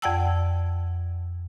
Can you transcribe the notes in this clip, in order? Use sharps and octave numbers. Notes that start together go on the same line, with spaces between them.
F2 D5 F#5 G5 A5 E6